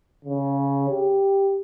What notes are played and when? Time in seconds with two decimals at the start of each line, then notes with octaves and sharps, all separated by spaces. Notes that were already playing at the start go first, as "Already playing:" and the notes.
0.25 C#3
0.90 G4